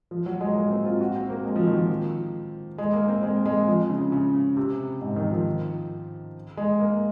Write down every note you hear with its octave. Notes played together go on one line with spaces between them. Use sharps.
F3
F#3
G#3
A#3
C4
F4
F#4
C4
A#3
G#3
F3
D#3
F3
G#3
A#3
C4
G#3
G#3
F3
C#3
C#3
C3
G#2
D#3
F3
G#3
A#3